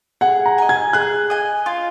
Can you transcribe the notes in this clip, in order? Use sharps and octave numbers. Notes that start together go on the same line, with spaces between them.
G#4 F#5
A#5
D#5 G#5
G#6
G#4 F#6
D#5 G#5
F4